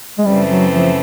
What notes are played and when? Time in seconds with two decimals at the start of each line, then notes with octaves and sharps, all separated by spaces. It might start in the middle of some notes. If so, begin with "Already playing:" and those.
0.18 G#3
0.25 F#2 C#3 E3 G3 A3 C4
0.49 F#3
0.72 F3